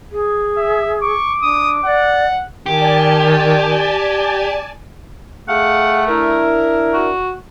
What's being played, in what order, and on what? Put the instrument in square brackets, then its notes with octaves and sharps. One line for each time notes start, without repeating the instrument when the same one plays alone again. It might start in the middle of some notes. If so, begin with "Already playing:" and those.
[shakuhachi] G#4
[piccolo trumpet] E5
[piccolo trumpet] C#6 [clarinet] D6
[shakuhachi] D4 [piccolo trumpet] D#6
[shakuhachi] D5 [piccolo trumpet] F#5
[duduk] D#3 [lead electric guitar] G4 [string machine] D5 G#5 A5
[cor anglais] A3 [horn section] G#4 F5 F#5
[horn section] D4 E4 A#4
[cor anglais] F#4